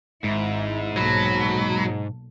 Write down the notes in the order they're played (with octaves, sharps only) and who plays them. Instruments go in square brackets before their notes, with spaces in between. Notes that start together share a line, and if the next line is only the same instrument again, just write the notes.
[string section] G#1 E4 [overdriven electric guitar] G#2
[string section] B1 A#2 A4 [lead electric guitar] F#3 [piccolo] B5